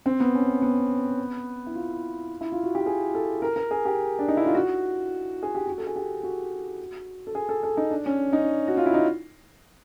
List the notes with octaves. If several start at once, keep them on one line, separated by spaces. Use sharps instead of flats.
C4
B3
C#4
B3
E4
F4
E4
F4
F#4
G4
G#4
A4
A#4
A#4
G#4
G4
D4
D#4
E4
F4
F#4
G#4
G4
F#4
A4
G#4
G4
F#4
A4
G#4
A4
A4
D#4
D4
C#4
D#4
F#4
F4
E4
D#4